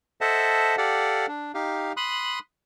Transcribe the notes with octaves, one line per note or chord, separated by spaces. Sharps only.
A4 C5 D#5 E5 F#5 A5
G4 A4 D5 F5 F#5
D4
D#4 G4 F5
B5 C6 D#6 F#6